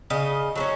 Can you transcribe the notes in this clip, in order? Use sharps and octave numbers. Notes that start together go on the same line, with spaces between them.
C#3 D#5
F#3 A3 C#4